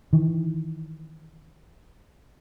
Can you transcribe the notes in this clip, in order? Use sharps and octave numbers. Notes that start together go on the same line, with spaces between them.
D#3 E3